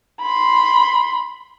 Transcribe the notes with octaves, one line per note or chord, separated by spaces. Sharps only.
B5 C6